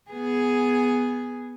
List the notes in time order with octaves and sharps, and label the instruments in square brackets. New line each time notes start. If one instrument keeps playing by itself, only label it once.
[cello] B3 G#4